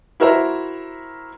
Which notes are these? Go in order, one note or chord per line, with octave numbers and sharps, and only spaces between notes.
E4 F#4 A#4 C5 E5 A#5